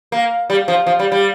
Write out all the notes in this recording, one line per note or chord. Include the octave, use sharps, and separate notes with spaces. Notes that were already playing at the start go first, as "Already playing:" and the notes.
A#3
G3
F3
F3
G3
G3